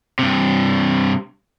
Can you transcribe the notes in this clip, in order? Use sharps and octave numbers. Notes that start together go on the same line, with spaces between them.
G2 C3